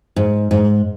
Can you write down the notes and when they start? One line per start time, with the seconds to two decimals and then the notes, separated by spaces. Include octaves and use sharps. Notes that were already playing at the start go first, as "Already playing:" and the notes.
0.16 G#2
0.51 G#2